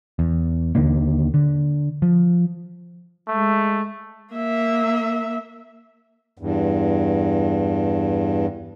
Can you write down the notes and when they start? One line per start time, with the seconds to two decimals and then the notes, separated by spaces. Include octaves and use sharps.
0.19 E2
0.75 D#2 D3 D#3 A#3
1.34 D3
2.02 F3
3.28 G#3 A3
4.34 A#3 E5
6.38 E2 G2